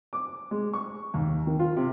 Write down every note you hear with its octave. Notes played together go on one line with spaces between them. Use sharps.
D6
G#3
C#6
D#2
D#3
F4
C3